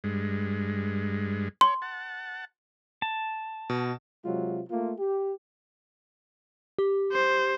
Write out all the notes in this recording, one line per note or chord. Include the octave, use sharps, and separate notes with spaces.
G2 G#3
C#5 C6
F#5 A5
A5
B2
C3 F#3 G#3 F4
A3 A#3 F4
G4
G4
C5